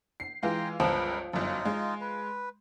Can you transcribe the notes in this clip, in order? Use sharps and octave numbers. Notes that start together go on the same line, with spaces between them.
C7
E3 G#3 F4 G5 A#5 C6
G1 C#2 F3 A#4 B4
G1 F#2 D#4 F4
G#3
B4